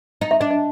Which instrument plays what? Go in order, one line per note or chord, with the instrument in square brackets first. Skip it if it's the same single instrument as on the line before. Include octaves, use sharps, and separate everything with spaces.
[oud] D#4 [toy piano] D#5
[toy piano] E5
[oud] D4 [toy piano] D#5
[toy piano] D#5